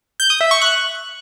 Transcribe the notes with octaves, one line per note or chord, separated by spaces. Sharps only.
G6
D#6
E5
C#6
F#6